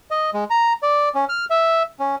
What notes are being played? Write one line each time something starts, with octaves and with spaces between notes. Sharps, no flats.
D#5
G#3
A#5
D5
C#4
F6
E5
C#4